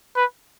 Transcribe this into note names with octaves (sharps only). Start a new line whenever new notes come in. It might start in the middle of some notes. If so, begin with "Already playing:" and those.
B4